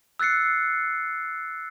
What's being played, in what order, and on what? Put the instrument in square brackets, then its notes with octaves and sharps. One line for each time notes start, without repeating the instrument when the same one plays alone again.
[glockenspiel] E6 F#6 A6 C7 C#7